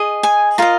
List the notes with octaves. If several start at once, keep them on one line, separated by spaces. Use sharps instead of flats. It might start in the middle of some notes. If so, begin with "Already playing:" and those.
Already playing: G#4 D#5
G#5
F4 A#4 D#5 A#5